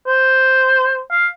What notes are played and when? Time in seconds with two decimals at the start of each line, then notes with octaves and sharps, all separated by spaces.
0.07 C5
1.12 F5